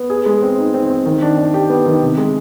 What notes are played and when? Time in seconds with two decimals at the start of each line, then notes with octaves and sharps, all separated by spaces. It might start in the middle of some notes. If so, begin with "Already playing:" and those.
Already playing: B3
0.10 G#4
0.26 G#3
0.43 C4
0.58 D#4
0.74 C4
0.90 C4
1.06 D#3
1.22 D4
1.38 D4
1.54 G4
1.69 B3
1.86 D#3
2.02 C3
2.18 G#3